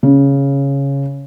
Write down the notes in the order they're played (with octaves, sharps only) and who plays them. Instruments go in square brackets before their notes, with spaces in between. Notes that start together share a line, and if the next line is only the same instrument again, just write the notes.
[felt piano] C#3